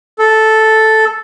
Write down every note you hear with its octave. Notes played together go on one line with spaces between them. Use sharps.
A4